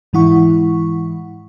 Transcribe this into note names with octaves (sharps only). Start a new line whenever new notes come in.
G#2 E3 G#3 E4 F#5 C#6